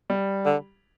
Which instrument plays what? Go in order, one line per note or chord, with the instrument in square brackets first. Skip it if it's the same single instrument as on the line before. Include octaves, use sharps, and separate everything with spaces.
[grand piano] G3
[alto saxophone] D3